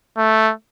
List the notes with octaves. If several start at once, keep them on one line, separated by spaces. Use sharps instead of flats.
A3